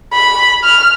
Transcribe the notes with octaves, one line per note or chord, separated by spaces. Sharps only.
B5
F6